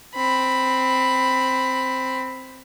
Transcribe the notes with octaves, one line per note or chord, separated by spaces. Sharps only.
C4 B5